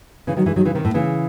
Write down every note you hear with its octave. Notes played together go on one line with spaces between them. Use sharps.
C#3 E3
D#3 F#3
E3 G#3
D#3 F#3
C#3 E3
C3 D#3
A2
C#3 E3